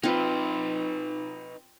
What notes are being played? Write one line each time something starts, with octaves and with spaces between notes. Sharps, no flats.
C4 D#4 F4 B4